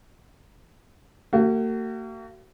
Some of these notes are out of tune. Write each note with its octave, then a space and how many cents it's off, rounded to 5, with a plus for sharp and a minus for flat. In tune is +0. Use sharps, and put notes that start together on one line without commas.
A#3 -45 F#4 +35